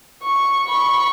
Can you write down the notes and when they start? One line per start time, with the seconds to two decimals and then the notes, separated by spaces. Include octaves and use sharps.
0.23 C#6
0.67 B5 C#6